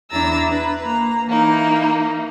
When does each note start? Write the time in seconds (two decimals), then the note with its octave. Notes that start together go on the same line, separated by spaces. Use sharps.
0.11 E2 D4 E4 A#5 E6 A6
0.50 B4
0.84 A#3 A#5
1.27 E3 A#3 D#4